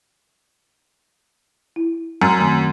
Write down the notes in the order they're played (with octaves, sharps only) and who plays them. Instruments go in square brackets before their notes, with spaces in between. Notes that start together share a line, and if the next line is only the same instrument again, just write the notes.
[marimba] E4
[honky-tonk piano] F#2 [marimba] A#5 E6 F6
[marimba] D#3 A3 C4